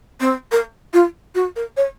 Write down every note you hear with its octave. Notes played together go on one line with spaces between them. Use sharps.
C4
A#4
F4
F#4
A#4
C#5